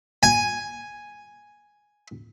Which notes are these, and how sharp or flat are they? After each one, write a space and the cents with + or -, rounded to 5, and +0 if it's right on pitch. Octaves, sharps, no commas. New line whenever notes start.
G#5 +0